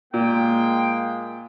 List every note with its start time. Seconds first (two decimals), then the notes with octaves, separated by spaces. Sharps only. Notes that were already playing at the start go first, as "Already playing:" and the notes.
0.14 A#2 G#3 A#3 G5